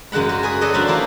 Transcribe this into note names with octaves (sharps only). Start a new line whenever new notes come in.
F#2 C#3 G#3 F#5 B5
F#4
G#4 B4 G#5
F#4 G#4 A4 B4 D5 D#5
F#3 D4 C5 F5 B5
A#3 D4 E4 F4